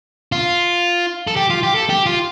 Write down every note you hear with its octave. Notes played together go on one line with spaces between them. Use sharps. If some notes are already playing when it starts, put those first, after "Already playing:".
F4
A4
G4
F4
G4
A4
G4
F4